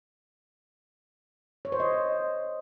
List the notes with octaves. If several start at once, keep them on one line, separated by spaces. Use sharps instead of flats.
C#5
C5
D#5